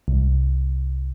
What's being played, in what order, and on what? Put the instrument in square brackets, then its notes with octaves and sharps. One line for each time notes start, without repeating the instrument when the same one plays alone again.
[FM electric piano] C2